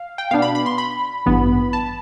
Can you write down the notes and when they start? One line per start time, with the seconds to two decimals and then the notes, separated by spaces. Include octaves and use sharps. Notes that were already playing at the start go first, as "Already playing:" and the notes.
Already playing: F5
0.18 G5
0.31 B2 B3 D4 F5
0.42 B5
0.55 B5
0.66 C6
0.78 B5
1.26 A1 G2 E3 B3
1.73 A5